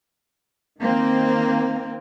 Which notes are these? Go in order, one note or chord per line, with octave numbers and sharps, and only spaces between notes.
D#3 A#3 C4